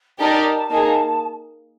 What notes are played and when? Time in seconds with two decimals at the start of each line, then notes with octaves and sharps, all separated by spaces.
0.20 D#4 G4 A#4 D5 A5
0.70 A#3 D#4 G#4